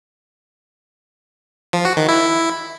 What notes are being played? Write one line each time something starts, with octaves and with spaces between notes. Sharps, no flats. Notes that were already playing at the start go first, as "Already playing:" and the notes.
F3
F#4
D#3
E4